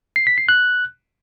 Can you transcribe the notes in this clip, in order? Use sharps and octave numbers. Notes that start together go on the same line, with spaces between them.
C7
B6
C7
F#6